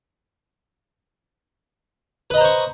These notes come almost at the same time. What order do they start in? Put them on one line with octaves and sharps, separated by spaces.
B4 D#5 A#5 C5 C#6